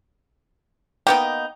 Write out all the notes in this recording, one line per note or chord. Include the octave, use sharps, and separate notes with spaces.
A#3 B3 D#4 G5